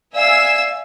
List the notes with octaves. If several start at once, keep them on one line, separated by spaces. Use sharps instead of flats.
D5 E5 F5 G#5 E6